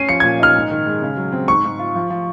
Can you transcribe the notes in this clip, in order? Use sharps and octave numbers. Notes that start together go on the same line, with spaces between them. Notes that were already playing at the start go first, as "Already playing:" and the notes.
Already playing: C#4 C7 D#7
F3 C#7
G#6
A#2
D#4 F6
G#2
D#3
G#3
C#3
F#3
C4
G#2 C#6
G#2
F4
F3
F3